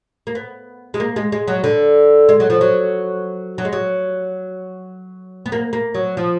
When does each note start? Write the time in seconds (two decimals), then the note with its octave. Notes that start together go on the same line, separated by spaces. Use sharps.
0.27 A#3
0.35 B3
0.94 G#3
1.00 A#3
1.16 G#3
1.32 G#3
1.48 F#3
1.64 D3
2.29 G#3
2.40 F#3
2.50 F3
2.61 F#3
3.58 F#3
3.65 G#3
3.73 F#3
5.46 B3
5.52 A#3
5.73 A#3
5.95 F#3
6.17 F3